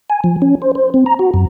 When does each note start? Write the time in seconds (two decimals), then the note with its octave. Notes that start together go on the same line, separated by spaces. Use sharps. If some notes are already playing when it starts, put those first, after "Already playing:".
0.10 G#5
0.24 F3
0.42 C#4
0.62 C5
0.75 C5
0.94 C4
1.06 A#5
1.19 F#4
1.34 F#2